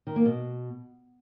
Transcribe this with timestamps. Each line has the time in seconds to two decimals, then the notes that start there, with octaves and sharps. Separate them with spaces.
0.07 D#3
0.16 A#3
0.25 B2